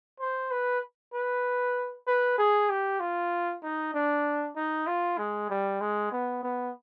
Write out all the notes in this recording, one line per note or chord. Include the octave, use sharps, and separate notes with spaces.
C5
B4
B4
B4
G#4
G4
F4
D#4
D4
D#4
F4
G#3
G3
G#3
B3
B3